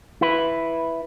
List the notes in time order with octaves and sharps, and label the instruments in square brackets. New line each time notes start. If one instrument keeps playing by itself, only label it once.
[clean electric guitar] E4 B4